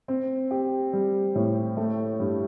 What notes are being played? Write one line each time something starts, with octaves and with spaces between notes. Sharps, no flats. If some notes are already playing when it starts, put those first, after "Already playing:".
C4
G4
G3
A2
A3
G2